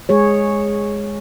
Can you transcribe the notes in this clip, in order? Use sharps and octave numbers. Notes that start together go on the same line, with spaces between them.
G#3 G#4 C#5